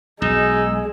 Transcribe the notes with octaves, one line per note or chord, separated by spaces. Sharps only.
B1 G#3 D#4 E6